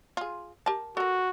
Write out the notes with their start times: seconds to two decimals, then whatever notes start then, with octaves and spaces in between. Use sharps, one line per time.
0.17 F4 G#4
0.66 G4 A#4 A5
0.97 F#4 A4 A#4